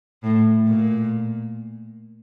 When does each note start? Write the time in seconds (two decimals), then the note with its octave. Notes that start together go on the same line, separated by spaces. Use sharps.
0.23 A2
0.67 A#2